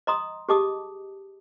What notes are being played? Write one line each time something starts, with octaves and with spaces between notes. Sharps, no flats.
D#5 A#5 C6 D#6
G4 G#4 D#5 A5 D6 D#6